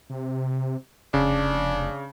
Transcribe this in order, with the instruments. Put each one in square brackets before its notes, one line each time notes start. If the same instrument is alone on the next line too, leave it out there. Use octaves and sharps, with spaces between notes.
[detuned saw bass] C3
[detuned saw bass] F1 [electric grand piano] C#3 [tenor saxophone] D4